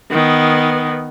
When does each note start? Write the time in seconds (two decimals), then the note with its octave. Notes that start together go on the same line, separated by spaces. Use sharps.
0.11 D#3 B3